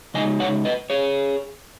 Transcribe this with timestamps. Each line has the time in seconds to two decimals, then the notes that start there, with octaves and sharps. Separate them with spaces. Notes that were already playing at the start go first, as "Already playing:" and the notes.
0.14 C#3 G#3 D#4 D#5 G#5
0.40 C#5 F#5
0.65 B4 D#5
0.90 G#4 C#5